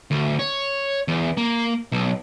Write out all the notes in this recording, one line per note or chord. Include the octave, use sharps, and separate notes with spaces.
D2
C#5
E2
A#3
B1